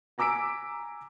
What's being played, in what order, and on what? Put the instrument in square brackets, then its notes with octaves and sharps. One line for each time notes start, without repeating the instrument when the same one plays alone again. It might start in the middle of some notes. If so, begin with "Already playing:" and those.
[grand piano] G#5 A#5 D6 E6 B6 D7